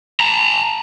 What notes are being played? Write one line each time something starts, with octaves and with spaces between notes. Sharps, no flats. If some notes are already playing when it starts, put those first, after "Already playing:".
A5 A#5